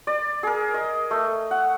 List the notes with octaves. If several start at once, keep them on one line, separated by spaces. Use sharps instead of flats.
D5
G#4 A#4
D#5
A3
F#5